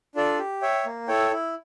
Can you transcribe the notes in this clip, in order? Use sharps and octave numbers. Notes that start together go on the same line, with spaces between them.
D4 F4 A4 D5
G4
C#5 E5 G5
A#3
E4 A4 C#5 G5
E4